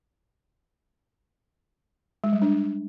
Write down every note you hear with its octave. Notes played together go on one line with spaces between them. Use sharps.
G#3
G3
D4